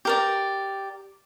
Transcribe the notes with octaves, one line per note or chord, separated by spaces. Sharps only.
G4 A#4 D5